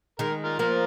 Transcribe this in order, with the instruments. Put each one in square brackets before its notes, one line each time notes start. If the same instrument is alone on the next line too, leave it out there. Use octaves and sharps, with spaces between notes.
[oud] D#3 G#3 [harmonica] A#4
[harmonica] F4 A#4
[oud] F3 A#3 [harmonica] F4 A#4